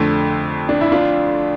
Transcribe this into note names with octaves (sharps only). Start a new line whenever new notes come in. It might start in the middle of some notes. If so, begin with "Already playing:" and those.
Already playing: F2 D3 A3
D4
E4
D4 F4